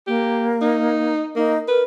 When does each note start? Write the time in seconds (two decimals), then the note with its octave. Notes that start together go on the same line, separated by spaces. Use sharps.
0.07 A#3 G4
0.61 D#4
1.36 A#3 D#4
1.68 A#4 B4